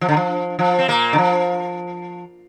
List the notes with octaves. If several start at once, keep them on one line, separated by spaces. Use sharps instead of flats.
F3
D3
F3
F3
C4
A#2 A#3
D3
F3